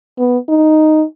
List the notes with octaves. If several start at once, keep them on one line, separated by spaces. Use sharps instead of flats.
B3
D#4